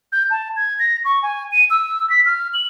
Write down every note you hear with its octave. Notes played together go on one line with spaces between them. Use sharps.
G6
A5
G#6
A#6
C#6
G#5
D#7
E6
B6
F6
F#7